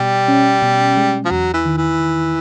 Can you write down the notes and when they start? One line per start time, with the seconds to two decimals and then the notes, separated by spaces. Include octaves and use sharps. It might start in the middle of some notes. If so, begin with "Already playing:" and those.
Already playing: B2 G3
0.28 C#4
0.62 B2
0.97 G#3
1.25 F3
1.31 E2 F#3
1.53 E3
1.65 D#3
1.77 E3
2.00 D#3